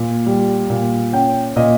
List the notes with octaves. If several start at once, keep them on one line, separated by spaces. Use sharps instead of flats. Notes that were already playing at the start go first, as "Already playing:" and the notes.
Already playing: A#2
G3
A#2
C#4 G5
A#2 D#5